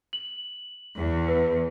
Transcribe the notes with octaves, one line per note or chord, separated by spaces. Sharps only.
F#7
E2
B4